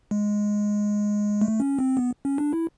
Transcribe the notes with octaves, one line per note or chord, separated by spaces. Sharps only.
G#3
A3
C#4
C4
B3
C#4
D4
E4